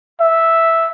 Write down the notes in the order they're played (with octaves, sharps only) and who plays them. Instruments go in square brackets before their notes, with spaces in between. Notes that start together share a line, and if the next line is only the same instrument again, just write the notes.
[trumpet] E5